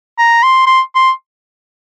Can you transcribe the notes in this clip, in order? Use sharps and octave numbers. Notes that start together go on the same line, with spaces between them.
A#5
C6
C6
C6